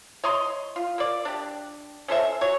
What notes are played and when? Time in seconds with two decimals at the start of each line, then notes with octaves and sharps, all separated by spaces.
0.24 C#5 D#5 A#5 C6
0.76 F4
0.98 A#3 D5
1.25 D4 G4
2.08 C#4 A4 C5 E5
2.41 F#3 C#5